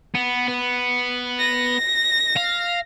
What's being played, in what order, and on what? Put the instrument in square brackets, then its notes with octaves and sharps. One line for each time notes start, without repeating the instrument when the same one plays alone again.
[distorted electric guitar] B3
B3
[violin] A#6
[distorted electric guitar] F5